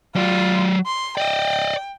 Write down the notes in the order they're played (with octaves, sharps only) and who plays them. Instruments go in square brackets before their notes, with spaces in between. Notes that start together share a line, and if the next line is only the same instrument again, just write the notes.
[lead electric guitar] F#3 D5 [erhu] F4
[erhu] C6
[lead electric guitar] D5 D#5 [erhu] G5